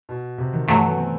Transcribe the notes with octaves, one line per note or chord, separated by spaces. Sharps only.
B2
C3
D#3
G2 E3 F#3 A3
E3
B3
C4